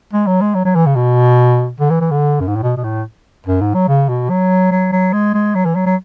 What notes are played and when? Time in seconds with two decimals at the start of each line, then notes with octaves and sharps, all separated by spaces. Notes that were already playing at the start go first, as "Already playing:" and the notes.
0.13 G#3
0.27 F#3
0.41 G#3
0.54 F#3
0.65 F#3
0.75 E3
0.86 C#3
0.96 B2
1.80 D3
1.90 E3
2.01 E3
2.11 D3
2.40 F#2
2.48 G#2
2.56 A2
2.63 B2
2.77 B2
2.84 A2
3.46 F#2
3.61 G#2
3.74 F#3
3.88 C#3
4.09 B2
4.30 F#3
4.72 F#3
4.92 F#3
5.13 G#3
5.34 G#3
5.55 F#3
5.65 E3
5.75 F#3
5.86 F#3